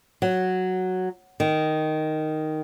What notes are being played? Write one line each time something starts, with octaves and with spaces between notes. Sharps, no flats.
F#3
D#3